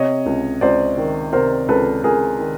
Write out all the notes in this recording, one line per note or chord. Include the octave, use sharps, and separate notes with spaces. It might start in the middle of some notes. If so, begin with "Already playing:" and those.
Already playing: C3 C#5 D#5
C#2
C#2 C5 D5
D#3
C3 A#4 C5
C#2 A4 B4
C#2 G#4 A#4
D#3